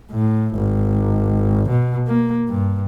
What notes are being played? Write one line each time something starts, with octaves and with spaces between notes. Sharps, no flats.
A2
G#1
B2
A#3
G2